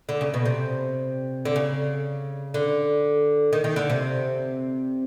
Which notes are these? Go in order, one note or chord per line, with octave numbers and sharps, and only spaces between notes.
D3
C#3
B2
C3
D3
C#3
D3
D#3
D#3
D3
C3